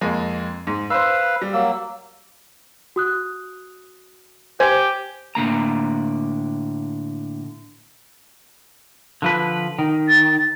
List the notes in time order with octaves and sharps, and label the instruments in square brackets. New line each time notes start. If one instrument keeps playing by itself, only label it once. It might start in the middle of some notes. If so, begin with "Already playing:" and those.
[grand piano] F2 G#3 A#3
G#2
[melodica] B4 F5 [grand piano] C5 E6
[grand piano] G3
[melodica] F#3 A#3 E6
[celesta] F#4 D#6 F#6
[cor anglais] G4 [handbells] C5 [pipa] G#5
[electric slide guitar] A2 D3 A#3 A#5
D3 F3 B4
D#3
[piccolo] A6